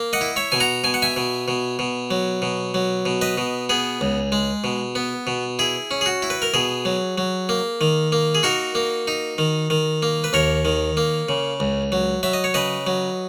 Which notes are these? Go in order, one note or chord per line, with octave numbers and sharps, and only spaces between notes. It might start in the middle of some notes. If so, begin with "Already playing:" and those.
Already playing: A#3
D#5 F#5
E4
C#5 E5
B2 G#5
F#5 A#5
B2 G#5
F#5
E5 G#5
B2
B2
B2
F#3
B2
F#3
B2
B4 D#5
B2
B3 G#4
C#2
G#3
B2
B3
B2
E4 G#4
C#4
G#4
F#4
E4
B4
A#4
B2 G#4
F#3
F#3
A#3
D#3
A#3
G#4
D#4 F#4 A#4
A#3
D#4
D#3
D#3
A#3
B4
D#2 A#4 C#5
D#3
A#3
C#3
C#2
F#3
F#3 E5
D#5
C#5
C#3 B4 D#5
F#3